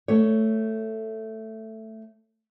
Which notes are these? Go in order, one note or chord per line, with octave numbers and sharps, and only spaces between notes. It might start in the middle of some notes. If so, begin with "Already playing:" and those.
A3 C#5